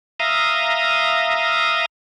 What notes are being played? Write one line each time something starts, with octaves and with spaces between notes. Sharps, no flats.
E5 F5 A#5 D#6